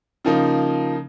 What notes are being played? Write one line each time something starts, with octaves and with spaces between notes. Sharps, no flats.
C#3 F3 A#3 D#4